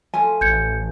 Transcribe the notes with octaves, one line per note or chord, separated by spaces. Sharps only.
F3 A3 F4 G#5
A1 G6 G#6 C#7